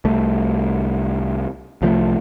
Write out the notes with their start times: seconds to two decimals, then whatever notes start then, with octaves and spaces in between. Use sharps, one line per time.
0.05 C2 A3
1.82 C2 F3 G#3 A3